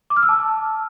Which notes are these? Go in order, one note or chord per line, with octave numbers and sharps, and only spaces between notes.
D6
F6
E6
A5